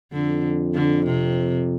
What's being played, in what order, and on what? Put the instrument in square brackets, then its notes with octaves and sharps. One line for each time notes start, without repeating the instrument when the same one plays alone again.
[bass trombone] F2 [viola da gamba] D3
[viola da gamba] D3
C3